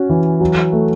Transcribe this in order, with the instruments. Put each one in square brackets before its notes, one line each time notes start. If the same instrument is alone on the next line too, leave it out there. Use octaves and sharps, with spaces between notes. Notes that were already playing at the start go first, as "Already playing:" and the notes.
Already playing: [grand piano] C#4 F#4
E3
F#3
A3